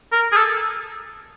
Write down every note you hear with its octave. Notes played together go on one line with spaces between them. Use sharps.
A#4
G#4
A4